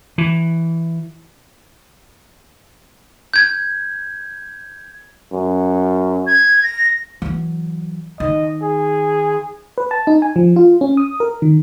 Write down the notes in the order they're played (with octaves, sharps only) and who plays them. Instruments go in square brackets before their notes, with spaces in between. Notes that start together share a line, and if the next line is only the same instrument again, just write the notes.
[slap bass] E3
[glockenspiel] G6 G#6
[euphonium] F#2
[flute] G#6
A#6
[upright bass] E3 F#3
[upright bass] D#3 [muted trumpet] D#5
[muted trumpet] G#4
[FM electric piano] B4
A5
D#4
G#5
F3
F4
C#4
D#6
A#4
D#3